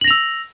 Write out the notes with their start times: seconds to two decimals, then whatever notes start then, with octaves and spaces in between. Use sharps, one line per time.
0.01 F#7
0.04 A#6
0.07 F7
0.11 E6